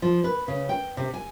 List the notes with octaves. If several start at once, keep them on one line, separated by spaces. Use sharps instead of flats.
F3
B4
C#3
G5
C3
G#5